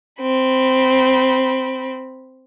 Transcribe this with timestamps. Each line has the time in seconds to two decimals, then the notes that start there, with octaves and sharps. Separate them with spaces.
0.21 C4 B5